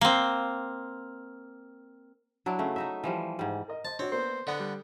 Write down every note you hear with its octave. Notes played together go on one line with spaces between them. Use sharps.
A#3 C4
F#3 D4 E4
C#3 A3
A3 D#4 E5
E3 F3 G3
G#2 G3
A#4 D#5
C5 D#5 A5
C4 D4 F#4 C#5
A#3 B3 C5 D5
D3 B3 D5 F#5
G3